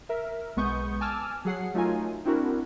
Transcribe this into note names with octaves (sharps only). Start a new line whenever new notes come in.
A#4 E5
B1 G#3 B3 C#6 D#6 G6
G#5 A5 D6 E6 F6
F#3 G#4 F#5 C7
F#3 A3 D#4 F4 A#4 G#5
C4 D4 E4 F#4 A#4